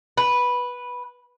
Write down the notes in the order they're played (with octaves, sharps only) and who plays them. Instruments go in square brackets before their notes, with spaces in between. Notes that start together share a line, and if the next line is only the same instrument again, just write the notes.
[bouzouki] B4